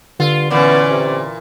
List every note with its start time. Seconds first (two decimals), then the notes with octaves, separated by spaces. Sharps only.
0.20 G2 D3 F4
0.51 A#2 E3 B3 C#4 D5
0.90 C3